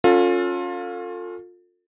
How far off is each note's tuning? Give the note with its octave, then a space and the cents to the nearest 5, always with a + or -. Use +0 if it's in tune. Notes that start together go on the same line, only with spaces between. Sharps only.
C#4 +0 F4 +25 A4 +25